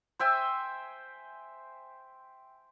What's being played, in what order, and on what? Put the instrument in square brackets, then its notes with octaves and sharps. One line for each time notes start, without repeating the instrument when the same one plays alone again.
[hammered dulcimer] C5 E5 G5 G#5